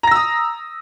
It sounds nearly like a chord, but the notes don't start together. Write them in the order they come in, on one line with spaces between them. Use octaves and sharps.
A#5 A#6 E6 D#6